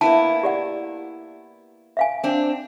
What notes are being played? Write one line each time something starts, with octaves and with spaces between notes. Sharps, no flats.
A#3 B3 E4 A5
G4 D5 F#5
E5 F5 G#5
C4 D4